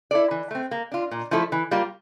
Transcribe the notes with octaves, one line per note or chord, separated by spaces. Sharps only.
E4 A4 D5
E3
A3 C4
A#3
D4 F4
A#2
F3 A3 E4 A4
E3
G3 A#3 F4